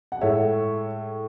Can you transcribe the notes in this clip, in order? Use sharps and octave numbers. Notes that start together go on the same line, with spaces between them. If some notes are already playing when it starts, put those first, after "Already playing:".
F#5
A2 G#3 C#5 E5